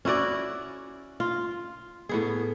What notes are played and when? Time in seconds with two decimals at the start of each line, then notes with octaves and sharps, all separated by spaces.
0.05 C#4 E4 F#4 D5
1.20 F4
2.09 A2 B3 G#4